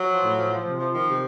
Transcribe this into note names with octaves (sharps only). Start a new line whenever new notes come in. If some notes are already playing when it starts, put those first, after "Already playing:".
Already playing: F#3
F3
A2
F3
F3
C3
F3
D#3 F3
C3